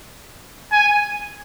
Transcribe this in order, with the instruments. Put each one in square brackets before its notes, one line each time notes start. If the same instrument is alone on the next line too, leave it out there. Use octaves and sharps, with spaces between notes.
[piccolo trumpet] G#5